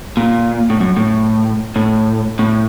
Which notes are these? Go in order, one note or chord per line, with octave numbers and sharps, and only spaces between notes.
A#2
A2
F#2
A2
A2
A2